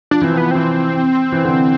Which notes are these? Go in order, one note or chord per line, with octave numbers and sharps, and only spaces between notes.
F3 D4
E3 C4
F3
B3
E3 C4
E3
D3